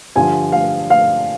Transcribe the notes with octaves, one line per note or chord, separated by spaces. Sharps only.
G2 D3 F3 G#5
F5
F5